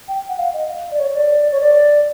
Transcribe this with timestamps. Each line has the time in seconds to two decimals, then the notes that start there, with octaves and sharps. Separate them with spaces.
0.08 G5
0.29 F#5
0.39 F5
0.54 D#5
0.91 D5
0.99 C#5
1.10 C#5
1.15 D5
1.52 C#5
1.60 D5